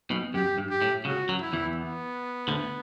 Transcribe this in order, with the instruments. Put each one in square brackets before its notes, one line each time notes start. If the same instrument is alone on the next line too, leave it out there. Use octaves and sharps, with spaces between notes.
[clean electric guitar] B1 B2
[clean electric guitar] F#2 [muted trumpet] G4
[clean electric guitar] G2
[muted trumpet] G4
[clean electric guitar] A2
[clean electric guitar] C#2 C#3 [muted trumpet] F#4
[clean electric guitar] F#2 F#3
[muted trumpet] E4
[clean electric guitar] E2 E3
[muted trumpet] B3
[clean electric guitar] D2 D3